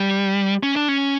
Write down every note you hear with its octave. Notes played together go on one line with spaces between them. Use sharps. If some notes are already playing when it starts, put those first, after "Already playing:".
Already playing: G3
C#4
D4
C#4